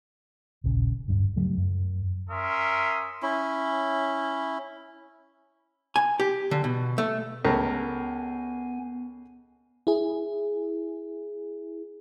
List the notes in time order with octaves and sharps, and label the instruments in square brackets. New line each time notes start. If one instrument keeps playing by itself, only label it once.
[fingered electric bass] D#1 A#1 C#3
D1 G2 D4
C#3 F#3 G3 A3
F#2
[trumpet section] C#4 A#4 E5 C6 D#6
[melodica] C#4 E4
[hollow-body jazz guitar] G#5
G4
D3
B2
A3
[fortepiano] C#2 A3 A#4 [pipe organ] B3 G#5
[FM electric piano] E4 G#4